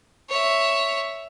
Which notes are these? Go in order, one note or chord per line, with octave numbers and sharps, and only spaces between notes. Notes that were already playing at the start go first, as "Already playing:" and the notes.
C#5 E5